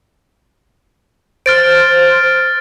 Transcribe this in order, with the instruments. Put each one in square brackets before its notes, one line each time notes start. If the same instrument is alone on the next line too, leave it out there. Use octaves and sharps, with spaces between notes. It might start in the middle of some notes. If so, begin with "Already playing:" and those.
[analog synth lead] C5 [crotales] F6 A6 D7